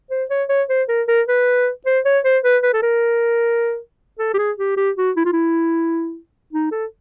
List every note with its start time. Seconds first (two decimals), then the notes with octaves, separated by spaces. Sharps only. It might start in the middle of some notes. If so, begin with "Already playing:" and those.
0.11 C5
0.30 C#5
0.49 C#5
0.69 C5
0.89 A#4
1.08 A#4
1.28 B4
1.86 C5
2.05 C#5
2.24 C5
2.44 B4
2.63 B4
2.74 A4
2.82 A#4
4.19 A4
4.34 G4
4.38 G#4
4.58 G4
4.77 G4
4.97 F#4
5.16 E4
5.25 F4
5.33 E4
6.53 D#4
6.72 A4